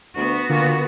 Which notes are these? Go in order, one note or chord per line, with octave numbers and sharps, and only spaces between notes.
D2 B3 F#4
A#2 D3